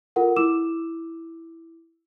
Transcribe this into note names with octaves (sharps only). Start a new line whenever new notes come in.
F4 A4 A#4 F#5
E4 D6 E6 E7